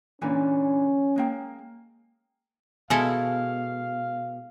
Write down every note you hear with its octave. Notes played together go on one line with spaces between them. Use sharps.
A#2 D3 E3 C#4
G#3 A#3 G5
B2 G#3 E4 A4 F5 G#5